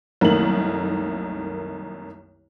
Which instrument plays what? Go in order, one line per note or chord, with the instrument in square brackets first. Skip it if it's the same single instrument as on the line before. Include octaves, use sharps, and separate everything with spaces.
[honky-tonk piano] C2 F#2 D#3 A3 A#3 F#7